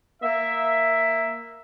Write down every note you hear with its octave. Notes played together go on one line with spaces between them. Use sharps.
A#3 E5